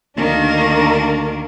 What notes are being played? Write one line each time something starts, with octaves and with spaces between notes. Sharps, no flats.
D2 D#3 A#3 D4